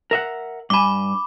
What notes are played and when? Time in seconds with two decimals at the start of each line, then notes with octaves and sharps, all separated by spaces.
0.11 A#4 E5 F#5
0.70 G2 G#5 B5 D6